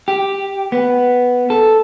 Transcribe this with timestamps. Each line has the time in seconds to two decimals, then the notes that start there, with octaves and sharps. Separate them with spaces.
0.08 G4
0.72 B3
1.50 A4